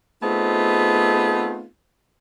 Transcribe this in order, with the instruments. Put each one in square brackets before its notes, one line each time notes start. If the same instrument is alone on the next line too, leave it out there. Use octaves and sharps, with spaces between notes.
[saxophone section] A3 B3 C4 D#4 F4 G#4